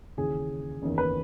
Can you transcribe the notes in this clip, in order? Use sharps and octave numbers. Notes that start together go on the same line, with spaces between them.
D#2 C#3 E3 G#4
F#1 E2 D#3
B4